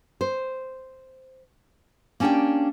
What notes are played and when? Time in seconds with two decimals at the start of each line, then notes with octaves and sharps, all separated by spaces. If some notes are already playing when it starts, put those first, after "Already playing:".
0.21 C5
2.20 A#3 C#4 D4 G4 D5 G5